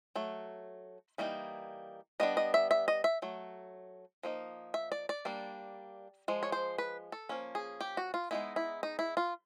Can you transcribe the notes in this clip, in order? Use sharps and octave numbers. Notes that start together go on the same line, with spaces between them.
F#3 A3
E3 G3 A#3 D#4
G3 B3 D4 D#5
D#5
E5
E5
D#5
E5
F#3 A3
F3 A#3 D#4
E5
D5
D5
G3 A#3 D4
F3 G#3
C#5
C5
B4
A4
F3 A#3 C#4
G#4
G4
F#4
F4
G#3 B3 D#4 E4
E4
D#4
E4
F4